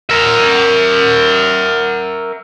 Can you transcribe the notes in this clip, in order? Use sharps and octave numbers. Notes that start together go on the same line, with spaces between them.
A#4 E5